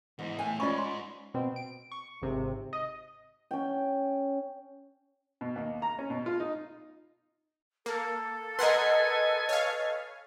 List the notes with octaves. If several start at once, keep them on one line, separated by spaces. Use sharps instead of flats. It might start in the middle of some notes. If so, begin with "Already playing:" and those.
E2 G#2 E3
A2 G5 G#5
G#2 C#4 F4 D5 B5 C#6
C6
B2 C4
D7
C#6
G#1 C3
D#5
C#4 G5
B2
D#2
A#5
C#4
B2
F4
D#4
A#3 A4
A#4 B4 D#5 F#5 G#5 C6
C#5 F5